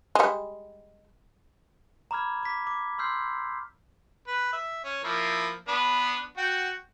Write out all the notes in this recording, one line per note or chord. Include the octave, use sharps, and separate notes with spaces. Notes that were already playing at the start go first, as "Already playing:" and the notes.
G3 G#3
A#5 B5 D6 F6 G#6
D6 B6
D6
C6 E6 F6 G6 C7
B4
E5
C#4
F3 A#3 E4
B3 D4 B4
F#4 F#5 G5